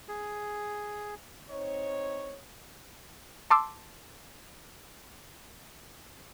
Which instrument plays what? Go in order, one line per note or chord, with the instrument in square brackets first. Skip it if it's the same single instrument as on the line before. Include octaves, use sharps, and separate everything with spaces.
[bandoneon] G#4
[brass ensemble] C4 D#4 C#5
[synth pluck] A5 C6 D6 E6